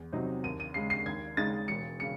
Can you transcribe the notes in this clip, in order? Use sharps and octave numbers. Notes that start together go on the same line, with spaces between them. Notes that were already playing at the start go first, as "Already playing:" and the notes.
Already playing: E2
C3 F#3 C4 D#4
D#2 D#7
D#7
C#3 G#3 C7
C7
D#2 G#6
C#3 G#3 D#4 A6
E1 C#7
C#3 C#7